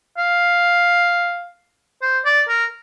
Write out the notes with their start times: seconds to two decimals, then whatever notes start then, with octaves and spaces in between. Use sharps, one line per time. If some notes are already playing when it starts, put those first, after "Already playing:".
0.18 F5
2.02 C5
2.25 D5
2.49 A#4